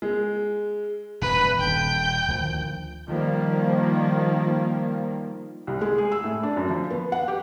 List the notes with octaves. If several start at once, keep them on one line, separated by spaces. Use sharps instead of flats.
G#3
E1 G2 B4
D#1 G5 G6
D2 D#3 F3
D#3 F3 G3 A#3
C2
G#3
G#4
E6
A2
D4
F#2
F3
B3
F#5
G4